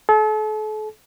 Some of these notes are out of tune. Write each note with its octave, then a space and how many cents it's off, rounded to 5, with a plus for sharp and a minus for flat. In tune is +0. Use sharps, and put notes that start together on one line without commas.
A4 -40